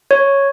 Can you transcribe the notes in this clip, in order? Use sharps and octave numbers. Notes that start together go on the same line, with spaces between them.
C#5